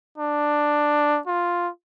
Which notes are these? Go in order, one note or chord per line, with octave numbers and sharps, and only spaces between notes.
D4
F4